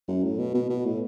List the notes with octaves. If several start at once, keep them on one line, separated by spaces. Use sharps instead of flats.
F#2
A2
B2
B2
B2
A2